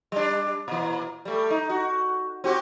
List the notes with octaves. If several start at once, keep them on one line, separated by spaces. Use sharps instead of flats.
G3 D4
A#2 E3
G3 A3
D#4
F#4
C4 F#4 G4